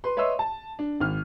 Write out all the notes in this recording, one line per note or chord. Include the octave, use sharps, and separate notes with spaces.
B4 C6
B4 C#5 D#5 E5 C6 E6
A5
D4
G#1 F6